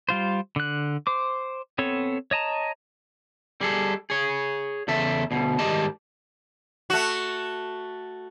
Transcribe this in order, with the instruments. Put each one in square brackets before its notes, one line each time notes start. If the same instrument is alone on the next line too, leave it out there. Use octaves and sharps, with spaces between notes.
[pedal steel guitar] G3 F4 C5
D3 F#6
C5 D6
B3 C4 A4 C#5
C#5 D#5 A5 A#5
[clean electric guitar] G3 G#4 A4
G#4 C#5
E2 C#3 A4 E5
D2 B2
G#2 D#3 G3 G4 D#5 A5
[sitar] A3 F#4